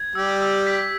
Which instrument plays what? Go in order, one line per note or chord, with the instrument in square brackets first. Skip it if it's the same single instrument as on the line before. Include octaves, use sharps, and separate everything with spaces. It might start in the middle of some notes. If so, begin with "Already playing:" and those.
Already playing: [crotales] G#6
[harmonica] G3 G4 [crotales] E6
[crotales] E6
B6